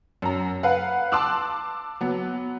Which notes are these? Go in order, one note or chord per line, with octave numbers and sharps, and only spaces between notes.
F#2 A#5
B4 F5 F#5
A5 C6 D6 E6 F#6
F#3 B3